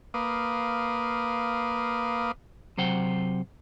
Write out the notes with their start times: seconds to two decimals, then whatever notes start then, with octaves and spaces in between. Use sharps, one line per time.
0.14 A#3 B4 F5 D6 D#6
2.78 C3 F#3 C5 F#5 G5